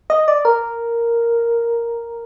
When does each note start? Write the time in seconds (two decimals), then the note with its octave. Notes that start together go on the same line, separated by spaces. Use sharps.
0.10 D#5
0.28 D5
0.45 A#4